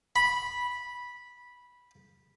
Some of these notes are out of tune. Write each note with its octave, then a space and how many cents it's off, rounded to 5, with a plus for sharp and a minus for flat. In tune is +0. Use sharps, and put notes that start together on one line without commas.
B5 -10